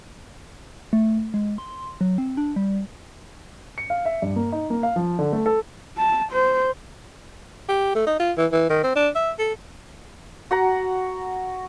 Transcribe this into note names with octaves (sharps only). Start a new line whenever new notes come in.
A3
G#3
C6
F#3
C4
D4
G3
C#7
F5
E5
G2
A#3
D#4
A#3
F5
F3
D3
A3
A4
A5
C5
G4
A3
D#4
F4
E3
E3
D#3
C4
D4
E5
A4
F#4 F#5 A#5